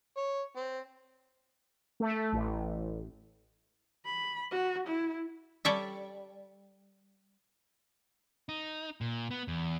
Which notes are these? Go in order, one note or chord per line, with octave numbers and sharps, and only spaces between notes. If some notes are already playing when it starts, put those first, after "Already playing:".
C#5
C4
A3
A1
B5
F#4
E4
G3 A4 C#5 D5 E5
D#4
A#2
B3
E2